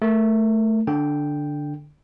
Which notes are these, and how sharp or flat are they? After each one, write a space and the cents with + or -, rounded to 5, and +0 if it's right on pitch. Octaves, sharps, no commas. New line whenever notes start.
A3 +0 A#4 +0
D3 +0 G5 +0